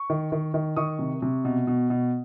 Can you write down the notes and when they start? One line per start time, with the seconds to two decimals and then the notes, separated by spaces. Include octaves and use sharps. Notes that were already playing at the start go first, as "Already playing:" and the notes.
Already playing: C#6
0.10 D#3
0.32 D#3
0.54 D#3
0.76 D#3 C#6 D#6
0.99 C3
1.22 C3
1.45 B2
1.67 B2
1.90 B2